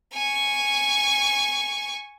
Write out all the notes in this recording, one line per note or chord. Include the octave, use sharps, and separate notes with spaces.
G#5 C#6